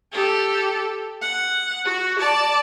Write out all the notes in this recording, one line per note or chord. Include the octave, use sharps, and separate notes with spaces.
G4 A4
F#5
F#4
D5 A5